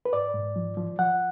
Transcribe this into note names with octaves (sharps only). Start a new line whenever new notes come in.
B4
G#2 D5
G#2
F3
F3
F3 F#5